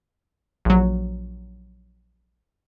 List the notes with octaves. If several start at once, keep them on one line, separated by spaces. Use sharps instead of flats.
A#1 F#3